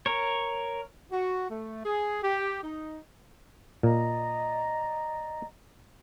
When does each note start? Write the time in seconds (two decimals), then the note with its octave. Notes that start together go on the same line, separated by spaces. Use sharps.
0.06 A#4 C#5
1.12 F#4
1.50 A3
1.85 G#4
2.23 G4
2.63 D#4
3.83 A#2 D5 D#5 A#5